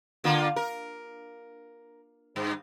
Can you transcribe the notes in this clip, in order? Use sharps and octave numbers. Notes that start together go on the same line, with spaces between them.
D3 A#3 F4
A#4
G2